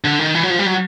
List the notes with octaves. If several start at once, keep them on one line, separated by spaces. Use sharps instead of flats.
D3
D#3
E3
F#3
F3
G3
F#3